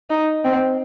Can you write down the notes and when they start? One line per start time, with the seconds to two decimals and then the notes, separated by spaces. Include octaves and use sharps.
0.10 D#4
0.45 C4